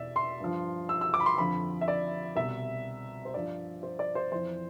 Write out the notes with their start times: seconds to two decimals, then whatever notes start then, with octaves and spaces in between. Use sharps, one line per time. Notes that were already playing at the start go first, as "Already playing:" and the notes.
Already playing: E2 B2 D5 E5
0.16 C6
0.40 G2 F3
0.89 E6
1.01 E6
1.14 D6
1.20 B5
1.26 C6
1.38 F2 D3 F3 B5
1.81 E5
1.88 D5
2.36 C2 B2 E5
3.25 C5
3.34 G2 F3 D5
3.83 C5
3.99 D5
4.15 C5
4.32 F2 E3 C5